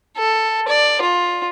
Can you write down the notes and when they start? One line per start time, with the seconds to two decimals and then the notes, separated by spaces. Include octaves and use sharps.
0.17 A4
0.68 D5
1.02 F4